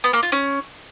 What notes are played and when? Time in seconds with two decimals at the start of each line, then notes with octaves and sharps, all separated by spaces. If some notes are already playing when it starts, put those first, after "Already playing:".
0.04 B3
0.13 A#3
0.23 F4
0.32 C#4